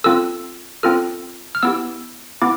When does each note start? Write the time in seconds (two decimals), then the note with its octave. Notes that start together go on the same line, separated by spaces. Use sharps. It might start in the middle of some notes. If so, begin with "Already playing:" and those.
0.04 C4 F4 A4 E6
0.83 C4 F4 A4 F6
1.55 F6
1.63 B3 E4 G4 E6
2.42 B3 E4 D6